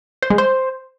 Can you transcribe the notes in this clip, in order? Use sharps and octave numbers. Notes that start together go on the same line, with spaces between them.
C5
G#3
C5